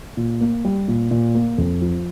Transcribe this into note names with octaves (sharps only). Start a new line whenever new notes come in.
A#2
A#3
G3
A#2
A#2
A#3
F2
F3